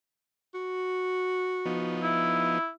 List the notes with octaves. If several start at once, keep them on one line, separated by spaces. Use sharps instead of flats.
F#4
F3 B3 D#4
E4